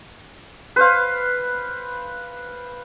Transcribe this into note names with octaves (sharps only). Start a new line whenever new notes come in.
B4 C5 F5